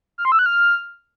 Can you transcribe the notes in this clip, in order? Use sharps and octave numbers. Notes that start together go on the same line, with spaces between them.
F6
C6
E6
F#6
F6